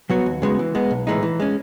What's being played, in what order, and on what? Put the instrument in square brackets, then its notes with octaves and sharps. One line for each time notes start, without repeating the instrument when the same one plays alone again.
[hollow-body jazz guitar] F#3 B3 F#4 C#5
D#2
C#3 G#3 B3 F#4
E3
G#3 B3
B1
A2 E3 G#3 D#4
E3
G#3 C#4